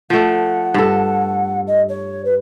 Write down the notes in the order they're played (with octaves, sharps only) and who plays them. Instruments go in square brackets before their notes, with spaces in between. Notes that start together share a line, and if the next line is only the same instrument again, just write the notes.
[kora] F3 A3 [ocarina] F#5
[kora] G2 A4
[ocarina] D#5
C#5
B4